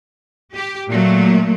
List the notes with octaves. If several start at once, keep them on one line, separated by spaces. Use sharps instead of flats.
G4
A#2 F#3 A3 A#3